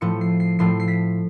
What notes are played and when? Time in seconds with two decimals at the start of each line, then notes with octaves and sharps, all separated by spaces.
0.01 A2 F3 A3 C#7
0.21 C7
0.40 C7
0.59 A2 F3 A3 C7
0.80 C7
0.88 B6